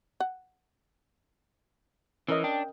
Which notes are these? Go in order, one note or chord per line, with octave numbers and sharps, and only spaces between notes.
F#5
E3 C#4 A#4 D#5
D4 G5